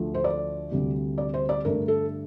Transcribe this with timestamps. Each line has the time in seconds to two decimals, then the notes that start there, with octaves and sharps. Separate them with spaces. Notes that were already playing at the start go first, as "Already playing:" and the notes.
Already playing: D2 D3 F3 A3
0.14 C5
0.24 D5
0.71 D2 C3 G3
1.18 D5
1.34 C5
1.49 D5
1.65 G2 D3 A3 A#4
1.88 A4